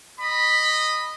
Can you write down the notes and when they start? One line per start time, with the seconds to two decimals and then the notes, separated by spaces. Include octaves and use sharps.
0.20 D#5 B5